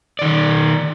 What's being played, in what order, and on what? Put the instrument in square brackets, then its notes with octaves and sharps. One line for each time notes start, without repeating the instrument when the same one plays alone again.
[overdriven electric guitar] D#3 D5